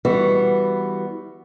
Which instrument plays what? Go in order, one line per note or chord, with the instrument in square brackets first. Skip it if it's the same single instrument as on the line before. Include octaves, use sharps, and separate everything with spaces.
[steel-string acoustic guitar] E3 G3 B3 F#4